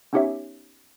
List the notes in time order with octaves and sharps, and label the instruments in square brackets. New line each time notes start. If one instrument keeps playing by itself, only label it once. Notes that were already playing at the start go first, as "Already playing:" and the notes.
[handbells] B3 C#4 D#4 G4 C#5 E5